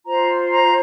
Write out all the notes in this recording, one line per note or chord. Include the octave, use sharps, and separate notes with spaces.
F4 C5 A#5
A#5